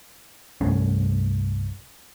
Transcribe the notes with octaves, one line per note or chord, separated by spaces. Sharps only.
C2 G2 A3 C#4